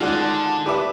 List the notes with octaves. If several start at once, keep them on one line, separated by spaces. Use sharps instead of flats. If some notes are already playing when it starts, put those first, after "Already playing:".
D3 D#3 G#3 F4 F#4 D5 F#6
A5
D4 G4 B4 E5 D6